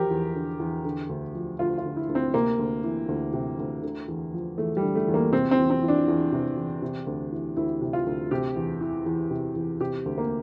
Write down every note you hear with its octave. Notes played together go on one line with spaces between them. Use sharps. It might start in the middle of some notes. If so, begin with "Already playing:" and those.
Already playing: E2 F3 G4 A#4
E2
D3
E2
D3
D2
F3
D2 F4
F4
D3
E4
D2
C4
C3 A#3
D2
E3
D2
C3
D2
D3
E2
F3
E2 A3
G3
D3
A3
E2
A#3
C3 C4
C4
E2
C4
E3
D4
E2
C3
E2
C3
D2
E3
D2 E4
C3
F4
D2
C3 G4
E2
E3
E2
C3
E2
C3 G4
D2
A#3